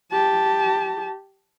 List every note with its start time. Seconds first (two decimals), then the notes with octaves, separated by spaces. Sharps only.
0.12 G4 A5